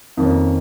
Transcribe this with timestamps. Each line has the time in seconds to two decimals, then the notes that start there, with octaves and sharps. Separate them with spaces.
0.17 F2 D#3 A#3 C#4